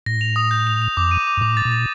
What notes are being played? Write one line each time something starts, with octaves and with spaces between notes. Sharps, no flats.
A2 A#6
F7
D#6
G6
F7
F7
F2 D6
D#7
D6
G2
A2 D6
A6
A#2
A6